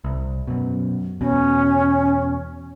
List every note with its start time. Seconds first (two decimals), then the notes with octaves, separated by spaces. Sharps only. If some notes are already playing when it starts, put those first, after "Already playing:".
0.04 C2
0.48 F#2 B2
1.21 E2 B2 C#4